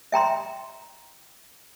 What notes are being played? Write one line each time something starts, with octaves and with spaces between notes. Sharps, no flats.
E5 G5 A#5 C6